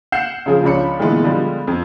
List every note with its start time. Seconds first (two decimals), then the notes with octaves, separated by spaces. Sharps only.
0.12 F#5 G6 C7 E7
0.46 C#3 F3 G#4
0.63 C#2 F3 C#4 D4 B5 C#7
0.99 A#2 D3 E3 G#3 A3 B3
1.23 D3 F3 G3 G#3 B3
1.67 F2